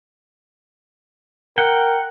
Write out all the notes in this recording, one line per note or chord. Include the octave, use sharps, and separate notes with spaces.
A#4 F#5 G5